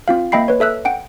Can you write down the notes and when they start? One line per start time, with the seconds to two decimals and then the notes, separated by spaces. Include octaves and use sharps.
0.08 C4 F4 F5
0.32 A#3 D#5 E5 G5 B5 C7
0.48 B4 C#5
0.60 A4 E5 E6 F#6
0.85 F#5 G5 D7